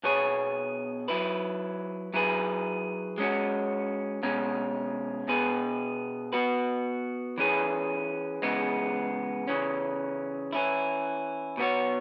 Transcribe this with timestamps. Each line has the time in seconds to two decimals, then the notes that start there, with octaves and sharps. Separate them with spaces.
0.04 B2 B3 G#4 C#5
1.08 F#3 E4 B4
2.14 F#3 E4 G#4 B4
3.18 G#3 C#4 F#4
4.23 B2 G#3 C#4
5.28 B2 B3 G#4 B4
6.33 B3 F#4 B4
7.38 E3 C#4 G#4 B4
8.42 C#3 E3 G#3 B3
9.48 C#3 E3 C#4
10.53 E3 C#4 E4
11.57 B2 B3 F#4 C#5